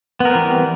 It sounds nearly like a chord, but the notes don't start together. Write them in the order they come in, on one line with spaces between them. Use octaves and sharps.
B3 A#4 C4 E3 G3